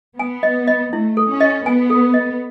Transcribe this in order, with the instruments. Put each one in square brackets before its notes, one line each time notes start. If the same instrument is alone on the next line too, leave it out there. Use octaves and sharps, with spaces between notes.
[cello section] B3 [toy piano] G#5
[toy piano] D#5
D#5
[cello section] A3 [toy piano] E4
[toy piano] A4
[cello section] C#4
[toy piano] D#5
[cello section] B3 [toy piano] G#5
[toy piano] A4
D#5